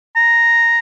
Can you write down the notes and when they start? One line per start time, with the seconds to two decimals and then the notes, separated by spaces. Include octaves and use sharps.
0.16 A#5